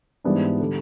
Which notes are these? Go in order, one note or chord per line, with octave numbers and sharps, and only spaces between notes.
G#2 E3 G3 B3 D4
D3 G3